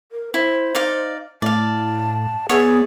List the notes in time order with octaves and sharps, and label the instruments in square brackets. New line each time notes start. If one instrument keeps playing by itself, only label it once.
[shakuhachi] A#4
[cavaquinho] E4 [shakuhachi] C5
[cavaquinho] D#4 D5 F5
[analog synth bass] A2 [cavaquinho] D5 F5 [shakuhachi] A5
[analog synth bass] B3 [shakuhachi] G#4 [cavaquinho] C#5 D5 E5